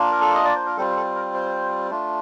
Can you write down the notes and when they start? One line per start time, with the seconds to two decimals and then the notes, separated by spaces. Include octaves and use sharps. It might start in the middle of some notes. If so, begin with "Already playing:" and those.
Already playing: A#3 D4 F4
0.12 A#4
0.21 A4
0.35 D#5
0.45 D5
0.56 C5
0.66 A#4
0.77 G3 C4 F4 A4
0.96 A4
1.15 A#4
1.34 C5
1.90 A3 D4 F4